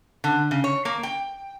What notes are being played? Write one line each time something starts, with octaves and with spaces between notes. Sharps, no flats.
D3
C#3
C#5
A#3
G5